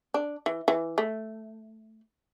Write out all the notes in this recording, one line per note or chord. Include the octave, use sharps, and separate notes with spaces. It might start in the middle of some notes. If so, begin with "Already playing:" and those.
D4
E3
E3
A3